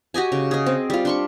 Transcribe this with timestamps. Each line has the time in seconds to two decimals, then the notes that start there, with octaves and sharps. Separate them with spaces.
0.14 F#4 G4 D#5 G#5
0.32 C#3
0.51 G#4 D#5
0.66 C4
0.90 G3 F4
1.05 D4 C6 C#6